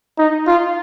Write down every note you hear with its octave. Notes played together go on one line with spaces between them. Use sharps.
D#4
F4